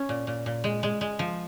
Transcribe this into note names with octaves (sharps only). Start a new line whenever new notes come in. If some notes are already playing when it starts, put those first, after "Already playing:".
Already playing: C#4
A#2
A#2
A#2
G#3
G#3
G#3
F3